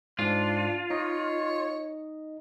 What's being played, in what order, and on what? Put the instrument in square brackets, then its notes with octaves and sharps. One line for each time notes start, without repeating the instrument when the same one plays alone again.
[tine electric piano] G#2 [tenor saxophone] D4 [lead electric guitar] F4
[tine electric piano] D#4 D#5 [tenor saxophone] C#5